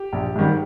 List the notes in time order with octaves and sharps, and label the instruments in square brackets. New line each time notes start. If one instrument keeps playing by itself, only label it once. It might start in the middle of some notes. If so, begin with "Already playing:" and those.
Already playing: [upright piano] G4
A#1
G#2 D#3 G3